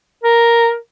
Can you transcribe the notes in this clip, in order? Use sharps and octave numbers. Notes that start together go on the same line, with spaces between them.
A#4